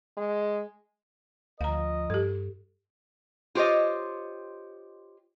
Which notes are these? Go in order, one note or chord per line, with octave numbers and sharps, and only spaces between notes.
G#3
D2 F3 A#4 D#5 F5 A#5
G2 G4 A4
F4 G4 C5 C#5 D#5